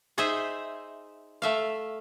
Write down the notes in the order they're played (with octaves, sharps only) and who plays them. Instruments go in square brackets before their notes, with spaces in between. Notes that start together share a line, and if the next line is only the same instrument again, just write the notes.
[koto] D#4 G#4 C5 D#5 E5
A3 E5 F5